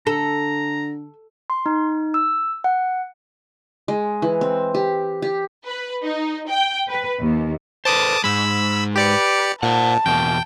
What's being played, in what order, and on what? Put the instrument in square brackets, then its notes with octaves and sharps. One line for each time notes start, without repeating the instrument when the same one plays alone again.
[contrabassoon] D3 [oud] A4 [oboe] A#5
[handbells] C6
D#4
E6
F#5
[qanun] G#3
E3
C4
G4
G4
[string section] B4
D#4
G5
B4
D#2
[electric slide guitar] A4 B4 C5 [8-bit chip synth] A5 D6 D#6
[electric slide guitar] G#2 G#3 [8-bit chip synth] B5 E6
[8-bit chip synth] G4 D5 C#7 [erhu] B4
[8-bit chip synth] A#2 [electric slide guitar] C5 F#5 [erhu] A5
[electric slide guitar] E2 B2 A#3 [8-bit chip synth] G5